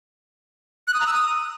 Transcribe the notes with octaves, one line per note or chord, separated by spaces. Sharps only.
F#6
D#6
A#5
E6
D#6